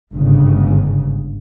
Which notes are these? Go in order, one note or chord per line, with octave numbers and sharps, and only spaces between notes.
G1 G#2 C#3